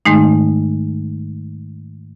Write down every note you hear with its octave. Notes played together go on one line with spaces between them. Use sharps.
G#2 D#3 G#3 A3 D#4